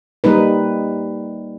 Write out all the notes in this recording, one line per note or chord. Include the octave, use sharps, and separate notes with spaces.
G3 A#3 D#4 B4